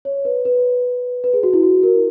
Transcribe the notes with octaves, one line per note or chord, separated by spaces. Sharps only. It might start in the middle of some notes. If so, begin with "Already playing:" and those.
C#5
B4
B4
B4
G#4
F#4
E4
F#4
A#4